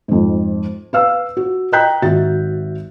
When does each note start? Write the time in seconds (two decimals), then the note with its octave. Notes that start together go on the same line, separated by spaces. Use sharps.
0.08 F2 G#2
0.93 B4 F5 E6
1.37 F#4
1.72 D#5 G5 A#5 F#6 G6 B6
2.02 G#1 F#4 E5 A6